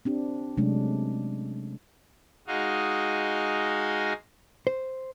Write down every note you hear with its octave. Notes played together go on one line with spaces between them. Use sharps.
C4 D4 G4
C3 F#3 G#3 A3 C#4 D4
G#3 D#4 F#4 D#5 F5
C5